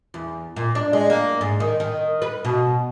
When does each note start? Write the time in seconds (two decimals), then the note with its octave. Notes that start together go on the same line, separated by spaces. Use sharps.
0.14 E2
0.56 A#2
0.75 D4
0.93 G#3
1.10 A#3
1.41 G#2
1.60 D#3
1.80 D#3
2.22 B4
2.45 B2